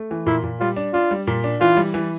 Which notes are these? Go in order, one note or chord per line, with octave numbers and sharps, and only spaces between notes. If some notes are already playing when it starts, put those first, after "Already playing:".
Already playing: A3
E3
A#2 E4
A#2
G3 F4
D4
D4 F4
G3
A#2
D4
E3 F4
G3
E3